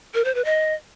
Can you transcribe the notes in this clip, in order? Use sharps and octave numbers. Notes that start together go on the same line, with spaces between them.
A#4
C5
B4
D#5